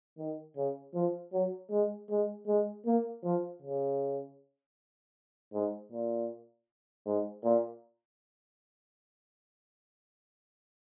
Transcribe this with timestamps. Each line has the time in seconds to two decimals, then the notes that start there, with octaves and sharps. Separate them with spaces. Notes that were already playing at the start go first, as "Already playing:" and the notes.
0.18 D#3
0.57 C#3
0.95 F3
1.33 F#3
1.71 G#3
2.10 G#3
2.47 G#3
2.86 A#3
3.24 F3
3.63 C#3
5.54 G#2
5.92 A#2
7.07 G#2
7.44 A#2